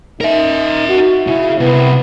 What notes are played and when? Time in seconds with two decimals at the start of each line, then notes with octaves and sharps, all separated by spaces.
0.21 D#4 A#4 E5
0.89 F#4
1.27 C#3 E4
1.60 C2 B3